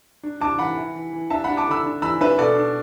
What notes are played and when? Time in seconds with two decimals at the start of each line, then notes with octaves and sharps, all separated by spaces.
0.23 D4
0.41 D4 A5 D6
0.59 E3 F#5 B5
0.77 E4
0.95 E3
1.13 E3
1.30 D4 E5 A5
1.44 F#5 B5
1.49 D4
1.57 A5 D6
1.67 D3 B5 E6
1.85 D4
2.02 E3 B5 E6
2.21 D4 B4 E5
2.38 B2 A4 D5
2.56 D4